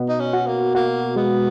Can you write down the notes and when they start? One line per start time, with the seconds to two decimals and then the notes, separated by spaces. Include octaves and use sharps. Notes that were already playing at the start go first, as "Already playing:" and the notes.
Already playing: B2
0.09 D#4
0.20 C#4
0.33 F#4
0.47 A#3
0.75 A#3 F#4
1.16 G#3 B3